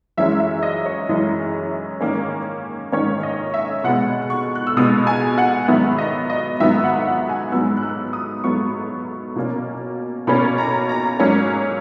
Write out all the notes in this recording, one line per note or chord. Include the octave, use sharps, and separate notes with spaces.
F#2 E3 G#3 C#4 E5
E5
D#5
C#5
F#2 E3 G#3 C#4 D#5
G#2 D#3 A#3 C#4
G#2 D#3 A#3 C#4 C#5
D#5
E5
B2 G#3 B3 F#5
C#6
F#6
E6
B2 G#3 B3 D#6
G#5
F#5
G#2 D#3 F#3 B3 E5
D#5
D#5
G#2 D#3 F#3 B3 E5
F#5
F#5
G#5
G#2 F#3 B3 E6
F#6
E6
D#6
G#2 F#3 B3 C#6
B2 A#3 C#4
B2 A#3 C#4 B5
A#5
A#5
G#2 F#3 A#3 C#4